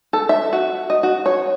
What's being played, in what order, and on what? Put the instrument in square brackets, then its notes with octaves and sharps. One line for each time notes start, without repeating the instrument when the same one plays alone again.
[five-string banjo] A4
E5
F#4
D#5
F#4
C#5